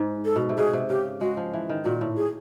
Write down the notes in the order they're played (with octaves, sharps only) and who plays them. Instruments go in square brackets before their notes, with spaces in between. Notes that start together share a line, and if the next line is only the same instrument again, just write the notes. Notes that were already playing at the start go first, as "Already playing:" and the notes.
Already playing: [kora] G#2
[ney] A4
[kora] B2
C3
[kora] B2 [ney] G#4
[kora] C3
[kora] C#3 [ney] G4
[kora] G#3 [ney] F#4
[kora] F3
E3
D#3
[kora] A#2 [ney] F#4
[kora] A2
[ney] G#4